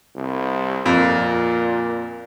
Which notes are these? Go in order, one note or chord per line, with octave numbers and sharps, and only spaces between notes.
C2
F2 A#2